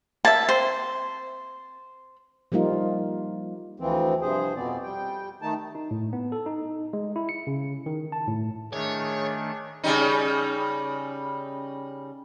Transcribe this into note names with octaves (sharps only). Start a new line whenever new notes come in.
A#3 E5 A5
C4 C5
F3 G3 A#3 D#4 F4
D2 E3 F3 C4
G2 C3 F3 G#4 C5
F2 B2 B3 C4 D5
G3 G5
D#3 A3 D#4 A5
D#4
A2
B3
A4
D#4
G#3
E4
C#7
C#3
D#3
A5
A2
D#3 A3 D4 G#4 C#5
C#3 G3 D#4